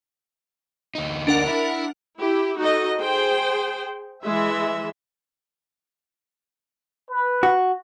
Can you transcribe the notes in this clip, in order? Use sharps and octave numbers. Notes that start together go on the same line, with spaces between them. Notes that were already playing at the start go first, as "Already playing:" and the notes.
D2 D#4
D4 A#4 F#5
E4
E4 G4
D#4 F#4 A4 D#5
G#4 C5 G5
E3 G#3 E5
B4
F#4